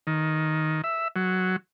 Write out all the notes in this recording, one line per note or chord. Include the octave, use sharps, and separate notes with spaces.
D#3
E5
F#3